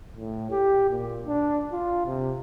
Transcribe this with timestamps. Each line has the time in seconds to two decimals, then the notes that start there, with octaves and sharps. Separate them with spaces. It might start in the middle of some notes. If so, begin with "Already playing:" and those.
0.17 A2
0.51 G4
0.91 A#2
1.27 D4
1.73 F4
2.06 C3